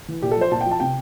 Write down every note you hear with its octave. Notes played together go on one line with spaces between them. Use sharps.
E3
A#2 G4
A4
F3
C5
A#2 A5
G5
F3
A5
C3 G5